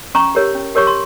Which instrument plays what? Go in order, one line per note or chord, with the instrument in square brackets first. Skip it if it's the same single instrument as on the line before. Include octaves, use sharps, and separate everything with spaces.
[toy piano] C#4 A#5 C#6
G4 A#4 C#5
C#4
G4 A#4 C#5 C#6
C6